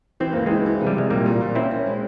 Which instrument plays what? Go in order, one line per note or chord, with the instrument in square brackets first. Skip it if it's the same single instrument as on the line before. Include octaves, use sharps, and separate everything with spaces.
[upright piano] E3 [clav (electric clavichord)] C4
[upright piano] C#2 [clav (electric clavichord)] A#3
[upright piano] E3 [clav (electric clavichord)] G#3 C4
[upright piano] E3
C3
[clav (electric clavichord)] G3
[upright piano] C3 [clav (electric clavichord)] G#3
[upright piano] A#2 [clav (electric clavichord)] G3 A#3
[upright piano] A#2
A#2
[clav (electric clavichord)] C4 E4 [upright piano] C#4
[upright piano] C#4
G#3